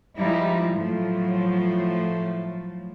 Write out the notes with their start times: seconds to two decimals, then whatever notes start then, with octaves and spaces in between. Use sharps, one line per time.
0.15 F3 G3 G#3 D#4 E4
0.74 A2 F3 F#3 A3